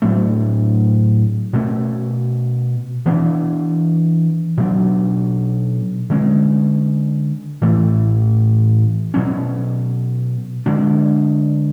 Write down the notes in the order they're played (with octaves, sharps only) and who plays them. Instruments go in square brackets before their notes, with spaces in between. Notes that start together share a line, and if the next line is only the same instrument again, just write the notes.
[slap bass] A2 F#3 A3 D4
B2 A3 C#4
E3 B3 D4
B2 F#3 B3 D4
D3 G#3 C#4
A2 E3 A3
B2 F#3 C#4
D3 G#3 D4